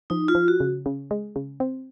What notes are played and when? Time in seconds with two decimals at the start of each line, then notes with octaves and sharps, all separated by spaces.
0.10 F3 D#4
0.28 F4
0.35 F3
0.48 F#4
0.60 C#3
0.86 C#3
1.11 G#3
1.36 C#3
1.60 C4